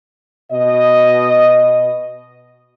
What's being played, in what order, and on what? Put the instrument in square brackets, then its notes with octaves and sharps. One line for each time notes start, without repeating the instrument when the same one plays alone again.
[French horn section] B2 D#5